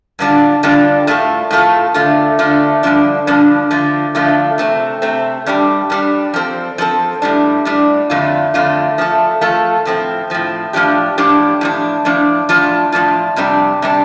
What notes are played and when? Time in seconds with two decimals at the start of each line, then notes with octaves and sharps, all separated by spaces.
0.19 G2 D3 G3 D4 F4
0.63 G2 D3 G3 D4 F4
1.07 A2 A3 F4 A4
1.51 A2 A3 F4 A4
1.94 D3 A3 F4
2.39 D3 A3 F4
2.83 G2 D3 F3 D4
3.27 G2 D3 F3 D4
3.71 D3 F3 A3 F4
4.15 D3 F3 A3 F4
4.58 C3 A3 C4
5.02 C3 A3 C4
5.46 G2 G3 D4 G4
5.90 G2 G3 D4 G4
6.34 F3 C4 A4
6.78 F3 C4 A4
7.22 A2 G3 D4
7.65 A2 G3 D4
8.10 F2 D3 A3 F4
8.54 F2 D3 A3 F4
8.98 F3 A3 F4 A4
9.41 F3 A3 F4 A4
9.85 A2 F3 C4
10.30 A2 F3 C4
10.73 A2 F3 D4 G4
11.18 A2 F3 D4 G4
11.61 A2 F3 D4
12.05 A2 F3 D4
12.49 A2 F3 D4 F4
12.92 A2 F3 D4 F4
13.36 F2 C3 G3 D4
13.82 C3 G3 D4